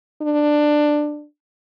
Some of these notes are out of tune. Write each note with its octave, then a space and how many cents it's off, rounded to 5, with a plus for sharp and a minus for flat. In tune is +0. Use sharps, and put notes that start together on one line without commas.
D4 +15